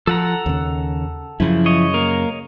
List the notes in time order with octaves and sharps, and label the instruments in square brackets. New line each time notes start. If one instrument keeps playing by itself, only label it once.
[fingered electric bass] F3 [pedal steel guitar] A4 F#5 A#5
[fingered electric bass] D#2 C#3
[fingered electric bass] F#2 C#3 [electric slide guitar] F3 E4
[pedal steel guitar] C#5 D#5
[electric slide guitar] A#3 A#4